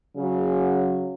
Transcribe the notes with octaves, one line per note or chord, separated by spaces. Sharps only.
C#3 F#3